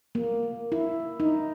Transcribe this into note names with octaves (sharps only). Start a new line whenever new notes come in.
A#3
E4
D#4